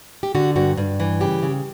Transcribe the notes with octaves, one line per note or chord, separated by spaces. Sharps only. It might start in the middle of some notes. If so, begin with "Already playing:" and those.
G4
D3 F#4
G2 F#4
G2
E3
C#3 G4
C#3